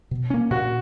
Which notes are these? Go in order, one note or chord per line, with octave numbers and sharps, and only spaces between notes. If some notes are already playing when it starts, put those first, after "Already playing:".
B2
A#3 C#4
A#2 F#4